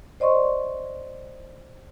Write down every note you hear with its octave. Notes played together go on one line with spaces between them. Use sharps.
C5 D5 D#5 C6 C#6